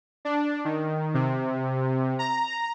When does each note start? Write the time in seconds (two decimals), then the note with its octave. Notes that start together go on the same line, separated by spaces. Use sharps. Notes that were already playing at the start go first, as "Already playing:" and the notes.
0.25 D4
0.65 D#3
1.14 C3
2.19 A#5